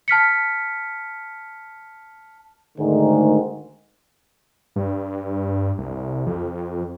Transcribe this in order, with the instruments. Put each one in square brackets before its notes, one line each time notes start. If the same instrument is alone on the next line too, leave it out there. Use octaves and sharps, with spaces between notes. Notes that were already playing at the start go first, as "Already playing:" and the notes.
[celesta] A5 F6 B6 C#7
[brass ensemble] D2 G#2 D#3
[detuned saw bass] G2
C2
F2